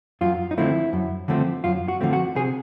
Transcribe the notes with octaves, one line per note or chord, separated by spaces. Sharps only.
F#2 F4
D#4
D3 F3 A3 C4 E4
F#2
D3 F3 A3 C4
F#2 F4
F#4
D3 F3 A3 C4
F#4
C3 G#4